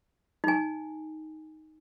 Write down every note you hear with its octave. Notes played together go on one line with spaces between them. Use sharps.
D#4 G#5